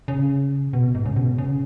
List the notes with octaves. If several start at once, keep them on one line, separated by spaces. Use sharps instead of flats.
C#3
B2
G#2
C#3
B2
C#3